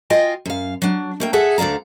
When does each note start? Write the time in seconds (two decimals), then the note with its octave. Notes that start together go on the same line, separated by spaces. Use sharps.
0.10 F4 D#5 G5 G#5
0.46 F#2 F5
0.82 F#3 D4
1.20 A3 A#3 G5
1.33 G#4 A4 E5 F#5
1.58 D2 D3 D5 F5 A#5